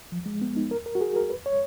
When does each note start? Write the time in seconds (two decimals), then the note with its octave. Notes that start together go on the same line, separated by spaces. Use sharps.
0.12 F3
0.26 G#3
0.42 B3
0.57 D#4
0.71 A#4
0.86 A#4
0.95 F#4
1.01 G#4
1.16 A#4
1.30 B4
1.46 C#5